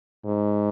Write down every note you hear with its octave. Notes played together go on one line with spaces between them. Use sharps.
G#2